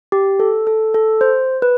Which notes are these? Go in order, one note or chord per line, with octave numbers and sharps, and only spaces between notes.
G4
A4
A4
A4
C5
B4